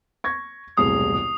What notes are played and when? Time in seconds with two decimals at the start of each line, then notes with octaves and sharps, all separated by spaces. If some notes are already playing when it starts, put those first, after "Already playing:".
0.24 C#6 G#6 A#6
0.78 E1 C2 A2 G#4 D#6